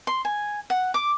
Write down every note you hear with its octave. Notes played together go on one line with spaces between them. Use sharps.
C6
G#5
F#5
D6